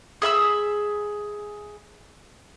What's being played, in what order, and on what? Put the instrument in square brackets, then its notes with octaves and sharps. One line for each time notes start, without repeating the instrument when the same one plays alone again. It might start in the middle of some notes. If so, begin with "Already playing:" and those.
[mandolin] G#4 E5 B5 E6